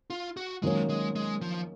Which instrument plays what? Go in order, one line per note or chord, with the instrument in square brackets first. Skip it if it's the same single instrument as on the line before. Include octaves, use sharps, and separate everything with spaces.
[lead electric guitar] F4
F#4
[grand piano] D#3 F#3 A#3 C#4 [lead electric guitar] G#3
[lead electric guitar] G#3
G#3
F3